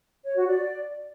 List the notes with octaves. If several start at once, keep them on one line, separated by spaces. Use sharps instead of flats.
C#5
F#4
D5